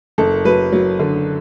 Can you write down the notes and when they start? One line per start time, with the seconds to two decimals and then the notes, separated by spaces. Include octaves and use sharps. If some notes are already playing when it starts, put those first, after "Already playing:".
0.18 F#1 A4
0.45 F#3 B4
0.72 F#3
0.99 D3